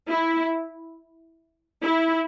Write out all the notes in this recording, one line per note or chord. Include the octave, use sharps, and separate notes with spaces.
E4
E4